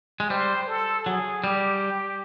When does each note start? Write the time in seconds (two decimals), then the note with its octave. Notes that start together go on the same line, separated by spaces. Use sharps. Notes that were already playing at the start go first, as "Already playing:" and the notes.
0.20 G#3
0.30 G3 C5
0.68 A4
1.06 F#3 G#4
1.44 G3 G4